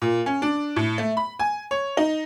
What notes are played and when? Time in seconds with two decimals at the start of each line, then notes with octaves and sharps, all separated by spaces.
0.02 A#2
0.26 C#4
0.42 D4
0.76 A2
0.98 A3
1.17 B5
1.39 G#5
1.71 C#5
1.97 D#4